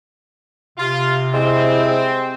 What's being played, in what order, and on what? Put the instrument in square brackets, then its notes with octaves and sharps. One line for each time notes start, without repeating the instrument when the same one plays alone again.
[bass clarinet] C3 [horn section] F4
[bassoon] G#3 [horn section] C4 [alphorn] E4